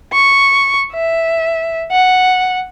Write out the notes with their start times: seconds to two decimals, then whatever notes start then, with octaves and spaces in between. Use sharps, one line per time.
0.13 C#6
0.94 E5
1.92 F#5